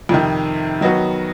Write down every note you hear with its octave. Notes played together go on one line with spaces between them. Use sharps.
F2 C3 D#3
D#3 F#3 B3 D#4 F#4